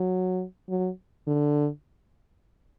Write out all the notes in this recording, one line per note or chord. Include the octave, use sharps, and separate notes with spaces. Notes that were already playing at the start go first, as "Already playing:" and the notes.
Already playing: F#3
F#3
D3